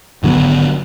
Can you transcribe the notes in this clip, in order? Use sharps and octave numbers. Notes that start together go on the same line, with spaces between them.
G#1 D3 F#3 B3